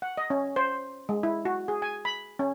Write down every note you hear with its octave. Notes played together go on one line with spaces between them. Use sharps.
F#5
D#5
C#4
C5
G#3
E4
F#4
G#4
G#5
B5
C#4